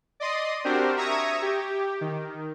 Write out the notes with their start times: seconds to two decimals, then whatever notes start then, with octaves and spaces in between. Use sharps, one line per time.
0.20 D5 D#5 C6 D#6
0.64 C4 D4 F#4 G4 A#4 C5
0.97 E5 A#5 C#6 D#6 G#6 A#6
1.42 G4
2.01 D#3